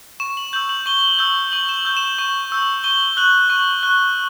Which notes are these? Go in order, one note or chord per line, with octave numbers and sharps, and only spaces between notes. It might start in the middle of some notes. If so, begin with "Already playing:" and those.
C#6 E7
F#7
E6 G6 F#7
F#7
C#6 G7
G7
E6 G6
C#6 F#7
E7
F#7
E6 G6
E7
C#6
E6 G6
C#6 G7
F#6 F#7
C#6
F#6